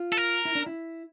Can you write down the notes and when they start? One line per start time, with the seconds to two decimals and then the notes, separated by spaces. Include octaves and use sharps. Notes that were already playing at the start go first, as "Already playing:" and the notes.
Already playing: F4
0.12 A4
0.17 A#4
0.45 E4
0.55 D4
0.66 E4